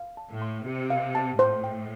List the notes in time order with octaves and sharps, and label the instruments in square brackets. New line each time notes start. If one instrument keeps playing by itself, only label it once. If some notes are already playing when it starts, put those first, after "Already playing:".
Already playing: [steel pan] F5
A5
[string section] A2
[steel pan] C6
[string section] C3 [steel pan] G4
[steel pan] F5
A5
[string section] A2 [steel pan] C5
[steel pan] G5